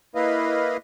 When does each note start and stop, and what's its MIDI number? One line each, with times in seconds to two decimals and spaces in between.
0.15 0.77 58
0.15 0.77 64
0.15 0.77 71
0.15 0.77 75
0.15 0.77 77